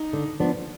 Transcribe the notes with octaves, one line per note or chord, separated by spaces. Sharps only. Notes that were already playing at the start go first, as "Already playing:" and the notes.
Already playing: D#4
D3
F3 B3 D4